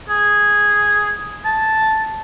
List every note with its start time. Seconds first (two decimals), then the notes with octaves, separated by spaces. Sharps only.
0.09 G#4
1.45 A5